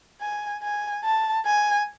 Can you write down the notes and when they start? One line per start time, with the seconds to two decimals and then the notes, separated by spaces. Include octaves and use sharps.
0.21 G#5
0.62 G#5
1.04 A5
1.46 G#5